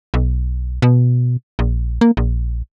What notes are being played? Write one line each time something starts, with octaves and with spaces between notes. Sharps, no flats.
B1
B2
A#1
A#3
A#1